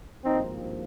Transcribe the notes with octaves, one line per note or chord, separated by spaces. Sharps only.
G#1 G2 F3 A#3 C4 D#4